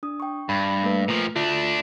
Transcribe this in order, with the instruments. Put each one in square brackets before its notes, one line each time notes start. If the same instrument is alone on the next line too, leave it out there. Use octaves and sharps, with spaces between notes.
[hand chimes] D4 D#6
G5 C#6
[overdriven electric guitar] G2 [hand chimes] B5 A6
[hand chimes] A3 A#3 B4
[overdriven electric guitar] A#2 F3
[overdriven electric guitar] A3 D4 [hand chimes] F4